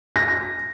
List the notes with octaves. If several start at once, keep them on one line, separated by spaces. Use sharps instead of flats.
A#6